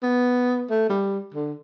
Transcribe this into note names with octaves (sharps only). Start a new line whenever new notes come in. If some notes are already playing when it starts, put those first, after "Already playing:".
B3
A3
G3
D3